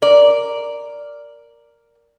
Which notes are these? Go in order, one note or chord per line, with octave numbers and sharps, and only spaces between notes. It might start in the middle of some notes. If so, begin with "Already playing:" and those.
A#4 D5